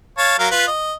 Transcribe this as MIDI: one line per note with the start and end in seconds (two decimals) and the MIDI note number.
0.18 0.35 73
0.18 0.35 77
0.18 0.35 81
0.39 0.48 54
0.39 0.48 70
0.39 0.48 77
0.51 0.67 65
0.51 0.67 71
0.68 0.94 75